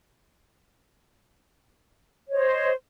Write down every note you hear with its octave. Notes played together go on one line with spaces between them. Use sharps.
C5 C#5 D#5